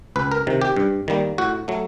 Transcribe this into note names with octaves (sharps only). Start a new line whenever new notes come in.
C#2 B4
A#4
C3 D#3
G4
G2
D#3 G3 A#3
A2 F#4
F#3 A3